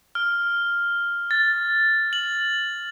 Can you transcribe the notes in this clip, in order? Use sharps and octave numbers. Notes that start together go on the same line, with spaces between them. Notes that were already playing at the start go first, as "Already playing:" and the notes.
F6
A6
F#7